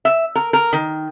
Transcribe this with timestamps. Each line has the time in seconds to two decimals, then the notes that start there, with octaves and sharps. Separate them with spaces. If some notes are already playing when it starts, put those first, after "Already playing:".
0.05 E5
0.35 A#4
0.53 A#4
0.73 D#3